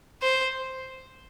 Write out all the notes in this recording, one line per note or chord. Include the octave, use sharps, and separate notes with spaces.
C5